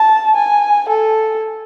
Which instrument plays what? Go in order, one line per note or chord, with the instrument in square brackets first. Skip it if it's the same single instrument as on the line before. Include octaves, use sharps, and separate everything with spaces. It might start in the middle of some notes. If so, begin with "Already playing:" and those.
Already playing: [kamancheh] A5
G#5
A4